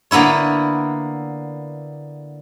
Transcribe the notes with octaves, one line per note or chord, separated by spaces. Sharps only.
D3 A#3 B3 E4 C#5